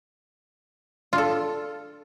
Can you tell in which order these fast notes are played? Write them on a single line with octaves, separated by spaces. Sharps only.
F4 D4 A4